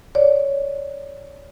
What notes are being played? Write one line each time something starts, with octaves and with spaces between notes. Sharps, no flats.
C#5 D5